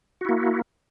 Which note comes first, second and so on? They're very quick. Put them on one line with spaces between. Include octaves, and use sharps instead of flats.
F#4 E4 A#3